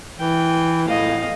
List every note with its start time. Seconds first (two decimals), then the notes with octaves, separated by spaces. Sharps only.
0.19 E3 G5
0.88 A2 D#5 F5